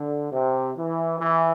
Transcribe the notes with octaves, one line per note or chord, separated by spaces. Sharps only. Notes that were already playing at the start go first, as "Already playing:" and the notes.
Already playing: D3
C3
E3
E3